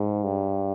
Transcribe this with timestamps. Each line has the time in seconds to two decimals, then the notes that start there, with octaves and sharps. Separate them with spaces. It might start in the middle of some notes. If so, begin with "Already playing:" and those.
Already playing: G#2
0.23 G2